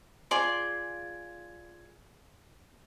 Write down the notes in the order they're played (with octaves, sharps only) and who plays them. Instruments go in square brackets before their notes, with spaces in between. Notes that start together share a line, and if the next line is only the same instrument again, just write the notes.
[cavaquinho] F4 G#4 D5 C6